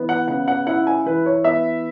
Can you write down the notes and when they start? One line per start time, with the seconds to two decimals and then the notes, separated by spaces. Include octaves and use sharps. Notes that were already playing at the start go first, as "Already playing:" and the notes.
Already playing: E3 B3
0.09 F#5
0.28 C#3 F#5
0.48 F#5
0.67 E4 F#5
0.87 G#5
1.06 E3 B4
1.26 C#5
1.44 B3 E5